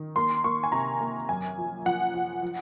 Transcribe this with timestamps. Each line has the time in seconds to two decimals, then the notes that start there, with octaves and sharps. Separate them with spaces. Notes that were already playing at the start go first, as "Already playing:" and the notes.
Already playing: D#3
0.16 A#3 C6
0.44 A#3 C#6
0.63 G#5
0.72 C3 A#5
1.01 A#3
1.29 F#2 G#5
1.58 F3
1.86 F3 F#5
2.14 F3
2.42 F3